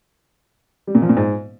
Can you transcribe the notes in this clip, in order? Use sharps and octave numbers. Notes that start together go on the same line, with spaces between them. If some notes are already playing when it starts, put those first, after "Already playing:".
G3
A#2
F3
A#2
G#2